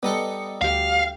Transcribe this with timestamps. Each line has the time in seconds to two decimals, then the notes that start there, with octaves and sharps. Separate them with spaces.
0.03 G3 B3 D#4 A4 D#5 C#7
0.62 D2 G4 F5